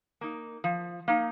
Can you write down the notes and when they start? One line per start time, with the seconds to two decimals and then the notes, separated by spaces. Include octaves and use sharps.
0.21 A#3 D#4
0.64 F3
1.08 A#3 D#4